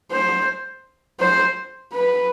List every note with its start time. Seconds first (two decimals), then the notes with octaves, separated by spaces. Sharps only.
0.12 C5
1.20 C5
1.93 B4